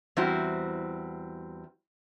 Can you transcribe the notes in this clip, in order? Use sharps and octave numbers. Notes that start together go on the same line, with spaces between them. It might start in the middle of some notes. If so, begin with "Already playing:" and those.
E2 G3 C4 E4 F#4 C5